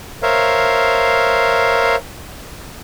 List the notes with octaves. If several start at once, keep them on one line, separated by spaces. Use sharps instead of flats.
A#4 C5 C#5 E5 F5